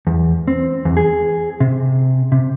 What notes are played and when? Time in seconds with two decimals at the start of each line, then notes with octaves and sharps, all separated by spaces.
0.07 E2
0.48 C4
0.85 E2
0.97 G#4
1.60 C3
2.32 C3